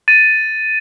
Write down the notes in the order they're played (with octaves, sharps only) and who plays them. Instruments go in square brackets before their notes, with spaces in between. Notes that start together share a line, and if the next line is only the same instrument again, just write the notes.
[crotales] A6 D#7